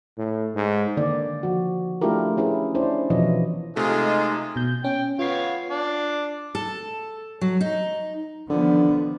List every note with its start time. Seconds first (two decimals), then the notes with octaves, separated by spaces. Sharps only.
0.18 A2
0.55 G#2
0.97 D3 D#3 A#3 D5
1.43 F3 F#4
2.01 A3 D4 E4 F4 G4 A#4
2.37 C#4 E4 G#4 B4
2.75 C#4 D4 E4 C5 D5
3.10 B2 E3 F3 E4 C#5 D#5
3.76 C3 G#3 A3 D#4 F4 A4
4.56 B2 G6
4.84 C#4 G5
5.19 B3 F4 C#5 F5 C7
5.70 D4 D5
6.55 A4
7.41 F#3
7.61 D#4
8.50 D3 D#3 F3 B3